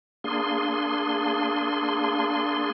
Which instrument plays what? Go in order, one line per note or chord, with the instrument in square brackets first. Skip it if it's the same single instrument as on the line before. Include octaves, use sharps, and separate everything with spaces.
[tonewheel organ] A#3 D4 G#4 C6